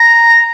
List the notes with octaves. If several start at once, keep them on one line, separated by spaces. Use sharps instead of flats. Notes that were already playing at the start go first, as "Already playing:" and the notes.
Already playing: A#5